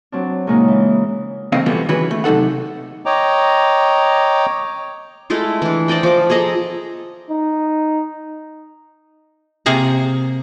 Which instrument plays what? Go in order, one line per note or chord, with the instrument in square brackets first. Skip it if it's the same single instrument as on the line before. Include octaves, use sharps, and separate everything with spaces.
[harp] F#3 C4 D4
A#2 C#3 F#3 G#3 A#3 D#4
E3
[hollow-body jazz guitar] E2 A2 C#3 C4 D#5 F5
B2 E3 F3 G3 A3 B3
D#3 E3 C#4 F#4 G#4 B4
A3
C3 F#3 D#4 A4 F#5
[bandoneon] C#5 D#5 G5 A#5 D6
[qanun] G#3 A3 E4 F4
E3 D4
C5 D5 D#5 G5
F3 D6
G#4 A4 D#5 A#5
[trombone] D#4
[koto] C3 A#3 G#4 A#5